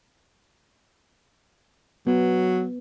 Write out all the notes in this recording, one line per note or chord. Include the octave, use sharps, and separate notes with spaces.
F#3 B3